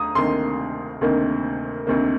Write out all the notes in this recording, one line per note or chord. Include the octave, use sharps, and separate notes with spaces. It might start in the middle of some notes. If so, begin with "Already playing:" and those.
Already playing: D2 A#5 D#6
D2 C3 D#3 A#3 C6
D2 C3 D#3 A#3
D2 C3 D#3 A#3